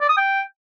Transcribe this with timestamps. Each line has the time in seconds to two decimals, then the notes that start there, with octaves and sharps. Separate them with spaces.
0.01 D5
0.09 D#6
0.17 G5